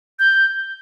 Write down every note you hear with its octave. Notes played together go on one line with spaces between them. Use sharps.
G6